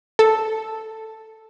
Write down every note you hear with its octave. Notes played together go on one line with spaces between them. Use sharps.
A4